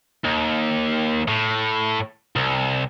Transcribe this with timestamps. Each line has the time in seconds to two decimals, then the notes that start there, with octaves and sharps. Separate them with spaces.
0.25 D#2
1.28 A2
2.36 C2